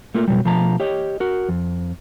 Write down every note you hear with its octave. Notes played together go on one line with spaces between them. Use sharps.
A3 A#3 F4 A#4
F2 B2 F#3 G3
B2 F3 A3 A5 A#5
G4 C#5 D#5
F#4 A#4
F2